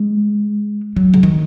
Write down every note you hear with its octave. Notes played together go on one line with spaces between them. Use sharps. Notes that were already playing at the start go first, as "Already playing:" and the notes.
Already playing: G#3
F#3
C#3
D#3